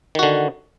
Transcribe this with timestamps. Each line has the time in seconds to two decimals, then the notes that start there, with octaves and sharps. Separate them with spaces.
0.15 D#3
0.19 F#4
0.23 D3